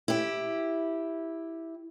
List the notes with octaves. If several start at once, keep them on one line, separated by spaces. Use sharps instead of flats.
E4 G4